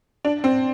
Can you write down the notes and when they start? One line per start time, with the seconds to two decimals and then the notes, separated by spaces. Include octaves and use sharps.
0.25 D4
0.44 C4